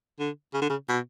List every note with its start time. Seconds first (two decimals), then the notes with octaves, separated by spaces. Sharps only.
0.19 D3
0.54 C#3
0.62 D3
0.70 C#3
0.89 B2